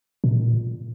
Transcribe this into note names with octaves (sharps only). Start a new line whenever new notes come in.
A#2